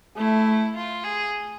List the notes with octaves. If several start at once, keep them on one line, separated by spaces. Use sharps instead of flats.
A3 E4
F4
G#4